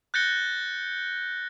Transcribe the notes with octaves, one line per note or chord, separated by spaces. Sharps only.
F#6 G6 A6 A#6 C#7 G7